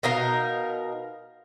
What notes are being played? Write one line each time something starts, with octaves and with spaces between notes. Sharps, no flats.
B2 D#4 A#4 F5